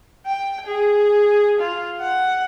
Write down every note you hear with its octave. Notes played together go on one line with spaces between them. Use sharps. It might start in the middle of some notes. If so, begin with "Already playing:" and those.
G5
G#4
F4
F#5